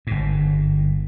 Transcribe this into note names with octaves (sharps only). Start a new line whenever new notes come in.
G1 G#2